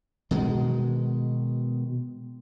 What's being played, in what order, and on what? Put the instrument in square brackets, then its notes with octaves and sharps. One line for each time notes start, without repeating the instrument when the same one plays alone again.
[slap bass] B2 D#3 G#3